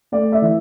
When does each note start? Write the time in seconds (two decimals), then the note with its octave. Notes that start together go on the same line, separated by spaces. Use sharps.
0.12 A3 D5
0.32 E5
0.41 E3